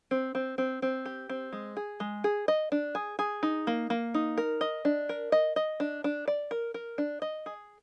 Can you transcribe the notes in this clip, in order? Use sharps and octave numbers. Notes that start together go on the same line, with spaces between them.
C4
C4
C4
C4
G4
C4
G#3
G#4
G#3
G#4
D#5
D4
G#4
G#4
D#4
A#3
A#3
D#4
A#4
D#5
D4
A#4
D#5
D#5
D4
D4
D5
A#4
A#4
D4
D#5
G#4